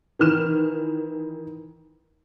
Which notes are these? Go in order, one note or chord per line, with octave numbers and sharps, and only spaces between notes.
D#3 E3 F6 E7